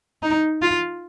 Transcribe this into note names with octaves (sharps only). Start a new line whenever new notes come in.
D#4
F4